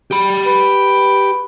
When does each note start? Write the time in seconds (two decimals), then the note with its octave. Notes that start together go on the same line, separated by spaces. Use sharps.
0.11 G4 B5
0.46 B4